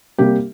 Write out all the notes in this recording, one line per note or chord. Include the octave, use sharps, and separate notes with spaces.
C3 G3 A#3 G4